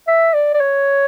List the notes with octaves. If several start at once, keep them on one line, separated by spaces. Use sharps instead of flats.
E5
D5
D5
C#5